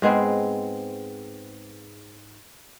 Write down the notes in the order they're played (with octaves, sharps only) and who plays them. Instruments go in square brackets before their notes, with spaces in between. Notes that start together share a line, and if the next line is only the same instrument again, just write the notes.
[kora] G#2 G#3 B3 C4